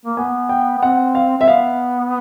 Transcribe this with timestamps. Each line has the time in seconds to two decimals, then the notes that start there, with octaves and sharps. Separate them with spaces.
0.05 A#3
0.17 B3 G#5
0.49 G5
0.77 B3
0.83 C4 F#5
1.15 F5
1.37 C4 E5
1.48 B3 F5